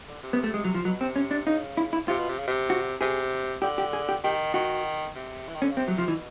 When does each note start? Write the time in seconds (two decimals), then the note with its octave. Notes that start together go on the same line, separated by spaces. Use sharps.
0.08 D3
0.23 C3
0.33 B3
0.44 A3
0.54 G#3
0.64 F#3
0.74 F3
0.85 B2 F#3
1.00 C3 C4
1.16 C#4
1.31 D4
1.46 C#3 D#4
1.77 E4
1.93 E4
2.08 C3 F4
2.19 B2
2.29 C3
2.38 C#3
2.47 C3
2.70 F#4
3.01 C3 G#4
3.62 D3 G4
3.78 G4
3.93 G#4
4.09 G4
4.24 D#3 G4
4.54 D#3 F#4
5.16 C3
5.48 E3
5.55 D#3
5.62 D3 C#4
5.70 C#3
5.77 C3 C4
5.88 F#3
5.98 F3
6.08 B2 E3